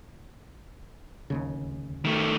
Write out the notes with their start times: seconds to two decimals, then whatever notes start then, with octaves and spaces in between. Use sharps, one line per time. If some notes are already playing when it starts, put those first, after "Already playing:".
1.30 D1 D#2 C#3
2.05 D#3 A3